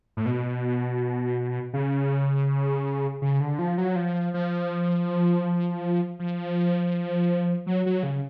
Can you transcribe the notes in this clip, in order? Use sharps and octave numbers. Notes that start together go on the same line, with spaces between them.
A2
B2
C#3
C#3
D3
F3
F#3
F3
F3
F3
F#3
F#3
C#3